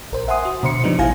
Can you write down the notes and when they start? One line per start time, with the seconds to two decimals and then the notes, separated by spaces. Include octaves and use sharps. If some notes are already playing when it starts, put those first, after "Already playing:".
0.12 A#1 A#4 C5
0.28 E5 F#5 G#5 C6 D#6
0.45 F#4
0.63 B2 D3 C5 C6 C#7
0.84 C#3 F3 G3 B3 D4 D#4
0.98 A1 E4 F5 G#5 G#6 A#6